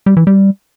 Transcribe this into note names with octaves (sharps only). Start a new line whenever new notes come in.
G3
E3
G3